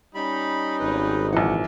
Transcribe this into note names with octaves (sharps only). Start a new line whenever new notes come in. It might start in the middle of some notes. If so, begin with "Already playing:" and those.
G3 C#4 D#4 B5
G#1 B4
A#1 E3 F#5